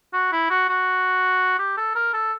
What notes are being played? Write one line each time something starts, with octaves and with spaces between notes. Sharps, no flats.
F#4
E4
F#4
F#4
G4
A4
A#4
A4